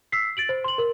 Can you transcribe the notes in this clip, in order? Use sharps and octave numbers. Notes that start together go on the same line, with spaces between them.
E6 B6 C7
A6 D7 F#7
C5
C6 F#7
A#4